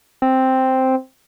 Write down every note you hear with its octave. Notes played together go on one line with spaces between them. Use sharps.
C4